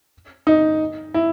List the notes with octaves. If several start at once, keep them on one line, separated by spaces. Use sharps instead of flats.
D#4
E4